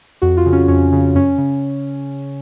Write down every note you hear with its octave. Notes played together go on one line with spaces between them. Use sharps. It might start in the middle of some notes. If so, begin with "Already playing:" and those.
F2 F#4
F4
C#3
C#4
F2 C#4
C#3
F#2 C#4
C#3